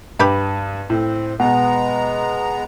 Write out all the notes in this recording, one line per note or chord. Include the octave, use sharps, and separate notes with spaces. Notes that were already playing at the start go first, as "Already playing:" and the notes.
G2 G4 B4 B5
A2 C4
B2 G#3 B3 F#5 A#5